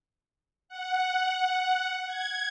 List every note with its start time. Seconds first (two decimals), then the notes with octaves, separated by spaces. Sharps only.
0.68 F#5
2.06 G#6